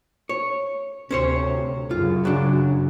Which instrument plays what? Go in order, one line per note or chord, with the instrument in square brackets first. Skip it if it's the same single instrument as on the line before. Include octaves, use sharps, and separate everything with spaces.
[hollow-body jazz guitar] C#5
[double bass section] D2 C3 [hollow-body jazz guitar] C#4 C5 C#5
[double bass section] F#2 C#3 [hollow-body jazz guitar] F4
[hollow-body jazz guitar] F#3 D4